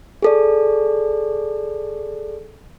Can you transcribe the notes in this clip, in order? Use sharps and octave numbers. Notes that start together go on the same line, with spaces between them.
G#4 A4 D5